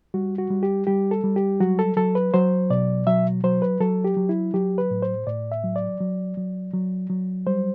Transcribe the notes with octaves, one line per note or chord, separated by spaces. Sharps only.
G3 F#4
F#4
G3
G4
G3 G4
A4
G3
G4
F#3 F#4
A4
F#3 A4
B4
F#3 C5
B2 D5
F#3 E5
F#3 C5
B4
F#3 A4
G4
F#3
E4
F#3 G4
B4
A2
C5
A2 D5
E5
F#3
D5
F#3
F#3
F#3
F#3
G3 C5